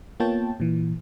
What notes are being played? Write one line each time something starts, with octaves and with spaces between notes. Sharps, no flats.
A#3 B3 F4 C#5 G5 A5
A#2 E3